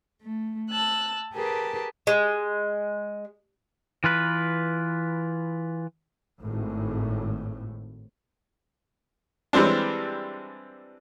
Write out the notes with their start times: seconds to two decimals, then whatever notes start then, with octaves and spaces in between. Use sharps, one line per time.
0.21 A3
0.70 A5 E6 F#6
1.32 G4 G#4 A#4 B4 A5
2.07 G#3
4.04 E3 F4 B4
6.40 G#1 A2
9.53 E3 G3 G#3 C4 D4